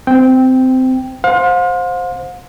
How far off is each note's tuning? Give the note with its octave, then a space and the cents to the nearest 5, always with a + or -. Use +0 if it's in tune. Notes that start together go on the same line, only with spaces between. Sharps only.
C4 -20 G5 +0
C5 +0 F5 +40